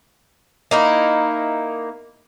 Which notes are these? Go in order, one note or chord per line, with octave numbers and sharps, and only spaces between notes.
A#3 D#4 E4